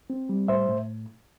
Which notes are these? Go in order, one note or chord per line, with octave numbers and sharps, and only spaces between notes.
C4
G3
A2 C5 E5
A2